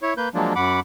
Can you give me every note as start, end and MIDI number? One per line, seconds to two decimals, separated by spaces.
0.02 0.14 64
0.02 0.14 73
0.17 0.29 58
0.17 0.29 71
0.17 0.29 91
0.35 0.53 53
0.35 0.53 54
0.35 0.53 56
0.35 0.53 58
0.35 0.53 62
0.56 0.80 42
0.56 0.80 78
0.56 0.80 83
0.56 0.80 86